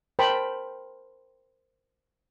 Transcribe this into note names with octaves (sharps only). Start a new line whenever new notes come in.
A#4 C5 G5 A5 B5